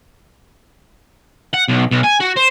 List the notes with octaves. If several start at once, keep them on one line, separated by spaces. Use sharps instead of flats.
F#5
B1
B1
G#5
F#4
C5